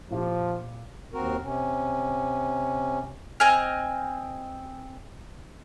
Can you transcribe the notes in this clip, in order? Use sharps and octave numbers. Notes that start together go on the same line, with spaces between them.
A#2 F3 F4 G4
D#2 C4 F#4 A#4
C3 C#4
C4 D#5 G#5 F6